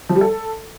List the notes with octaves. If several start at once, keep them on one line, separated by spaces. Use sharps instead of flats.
F3
G3
A4